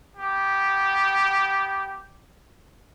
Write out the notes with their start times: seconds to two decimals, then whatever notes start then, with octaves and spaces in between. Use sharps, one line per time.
0.17 B3 G4